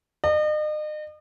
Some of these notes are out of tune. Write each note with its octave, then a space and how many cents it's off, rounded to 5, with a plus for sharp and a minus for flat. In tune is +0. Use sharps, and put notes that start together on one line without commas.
D#5 -40